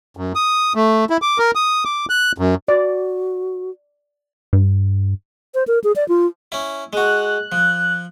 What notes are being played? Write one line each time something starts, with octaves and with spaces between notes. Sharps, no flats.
F#2
D#6
A3
E4
D6
A#4
D#6
D6
F#6
F#2
F#4 D5
G2
C5
A#4
G#4
D5
F4
C#4 E4
G#3 F#4 F#6
F3